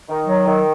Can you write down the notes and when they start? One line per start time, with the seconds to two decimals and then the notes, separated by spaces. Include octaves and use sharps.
0.09 D#3
0.27 F#3
0.46 D#3